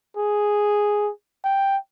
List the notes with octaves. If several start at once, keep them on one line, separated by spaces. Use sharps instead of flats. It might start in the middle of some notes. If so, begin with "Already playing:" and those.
G#4
G5